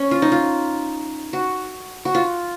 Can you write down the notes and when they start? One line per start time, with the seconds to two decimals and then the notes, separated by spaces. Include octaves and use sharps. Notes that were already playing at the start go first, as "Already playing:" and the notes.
Already playing: C#4
0.11 F4
0.22 D#4
0.32 F4
1.33 F#4
2.05 F#4
2.15 F4